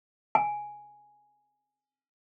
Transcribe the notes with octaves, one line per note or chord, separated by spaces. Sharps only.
G#5